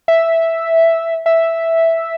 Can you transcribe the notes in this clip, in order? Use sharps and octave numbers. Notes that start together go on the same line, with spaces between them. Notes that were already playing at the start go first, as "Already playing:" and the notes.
E5
E5